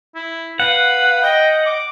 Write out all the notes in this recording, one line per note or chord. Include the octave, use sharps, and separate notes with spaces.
E4
B4 F5 F#5
D#5 G5
D6